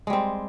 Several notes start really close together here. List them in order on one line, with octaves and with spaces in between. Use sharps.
G#3 G3 C4